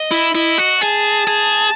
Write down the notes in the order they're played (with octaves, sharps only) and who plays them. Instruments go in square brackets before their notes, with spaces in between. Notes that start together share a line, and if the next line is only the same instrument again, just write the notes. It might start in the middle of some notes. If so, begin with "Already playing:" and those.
Already playing: [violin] D#5
[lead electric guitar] E4
[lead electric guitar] E4 [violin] D#5
[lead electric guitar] F#4
[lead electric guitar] G#4 [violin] A5
[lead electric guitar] G#4